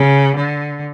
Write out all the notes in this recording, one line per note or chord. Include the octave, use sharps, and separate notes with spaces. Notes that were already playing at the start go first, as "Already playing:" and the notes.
Already playing: C#3
D3